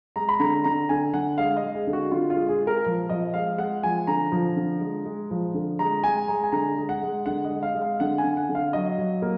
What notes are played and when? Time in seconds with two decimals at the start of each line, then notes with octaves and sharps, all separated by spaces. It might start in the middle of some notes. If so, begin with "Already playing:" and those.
0.16 G#3 A#5
0.29 B5
0.40 D3 A#5
0.64 D3 A#5
0.89 D3 G#5
1.14 D3 F#5
1.38 G#3 F5
1.57 D#5
1.63 G#3
1.75 G#4
1.87 D3
1.93 F#4
2.11 D3 F4
2.30 F4
2.36 G#3
2.49 G#4
2.60 G#3
2.67 A#4
2.86 F3
3.09 F3 D#5
3.34 G#3 F5
3.58 G#3 F#5
3.83 F3 G#5
4.07 D3 A#5
4.32 F3
4.57 D3
4.81 G#3
5.05 G#3
5.31 F3
5.54 D3
5.79 G#3 A#5
6.04 G#3 G#5
6.28 G#3 A#5
6.43 G#5
6.52 D3 A#5
6.78 G#3
6.89 F#5
7.02 G#3
7.26 D3 F#5
7.45 D#5
7.50 G#3
7.63 F5
7.75 G#3
7.82 F5
8.00 D3 F#5
8.18 G#5
8.24 D3
8.37 F#5
8.49 D3
8.55 F5
8.73 F#3 D#5
8.98 F#3
9.22 A#3